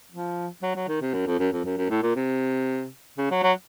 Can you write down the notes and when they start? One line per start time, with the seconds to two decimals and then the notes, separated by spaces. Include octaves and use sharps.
0.12 F3
0.62 F#3
0.76 F#3
0.88 D#3
1.01 C3
1.13 F#2
1.26 F2
1.39 F#2
1.52 F2
1.65 F#2
1.78 F#2
1.90 A2
2.02 A#2
2.16 C3
3.18 C#3
3.31 F#3
3.43 F#3